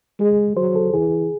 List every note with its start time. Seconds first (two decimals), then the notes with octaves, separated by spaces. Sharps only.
0.19 G#3 G#4
0.57 F#3 C5
0.75 A4
0.94 E3 G#4